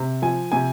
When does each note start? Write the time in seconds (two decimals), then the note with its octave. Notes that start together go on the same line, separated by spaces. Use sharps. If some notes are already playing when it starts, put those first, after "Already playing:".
Already playing: C3
0.22 F3 G#5
0.52 C3 G#5